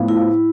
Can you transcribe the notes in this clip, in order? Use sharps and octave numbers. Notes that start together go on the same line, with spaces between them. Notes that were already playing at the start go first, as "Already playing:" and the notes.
Already playing: A2 F3 B3 F4
E4